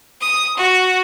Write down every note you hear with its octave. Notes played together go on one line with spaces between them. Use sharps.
D#6
F#4